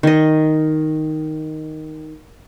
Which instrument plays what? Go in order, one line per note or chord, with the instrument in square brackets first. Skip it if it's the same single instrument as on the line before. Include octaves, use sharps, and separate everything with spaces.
[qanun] D#3 D#5